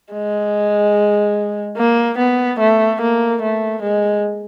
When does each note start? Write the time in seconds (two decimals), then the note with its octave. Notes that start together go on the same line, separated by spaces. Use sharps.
0.14 G#3
1.77 A#3
2.18 B3
2.60 A3
3.01 A#3
3.42 A3
3.82 G#3